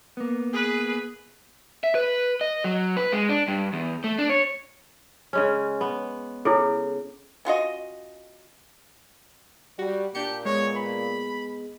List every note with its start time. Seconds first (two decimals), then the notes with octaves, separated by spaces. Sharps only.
0.17 A#3 B3
0.53 G#4 B4
1.84 E5
1.95 B4
2.41 D#5
2.64 F#3
2.97 B4
3.12 G#3
3.29 D4
3.48 G2
3.73 E2
4.04 A3
4.18 D4
4.30 C#5
5.33 C#3 G#3 C#4
5.81 B3
6.45 C#3 E4 G#4 A4
7.45 C#4 F4 F#4 D#5
9.79 G3 F#4
10.15 A#2 D4 G4 G6 C#7
10.45 G#3 B3 C#5
10.77 B5